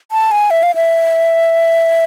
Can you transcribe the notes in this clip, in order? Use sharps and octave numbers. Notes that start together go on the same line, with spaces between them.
A5
G#5
E5
F5
E5